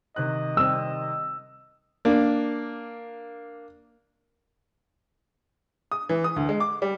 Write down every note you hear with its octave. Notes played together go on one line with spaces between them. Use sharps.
C3 D#3 D#5 F#6
G3 C4 E6
A#3 D4
D#6
E3
D#6
D2
G#3
D6
G3